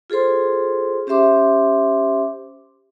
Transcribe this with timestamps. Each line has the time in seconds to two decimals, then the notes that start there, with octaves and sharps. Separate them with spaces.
0.10 F4 G#4 A4 C5 C6
1.07 C#4 G4 C5 E5 C6 D6